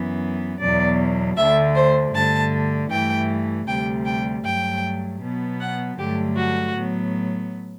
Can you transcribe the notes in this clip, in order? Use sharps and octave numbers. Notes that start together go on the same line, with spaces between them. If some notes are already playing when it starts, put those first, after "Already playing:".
Already playing: F#2 E3 B3
E2 B2 F#3 D5
D2 D3 A3 E5
C5
G2 D3 A3 A5
G2 E3 A3 G5
D2 C3 G3 G5
G5
G2 F#3 A3 G5
B2 F#3 B3
F#5
G2 D3 F#3 A3 G4
F#4
A2 F#3 B3